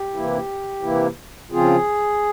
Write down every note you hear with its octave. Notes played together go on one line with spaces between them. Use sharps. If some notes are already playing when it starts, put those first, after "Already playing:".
Already playing: G4
C3 E3 A#3 E4
C3 E3 A#3 E4
C#3 F3 C4 F4 G#4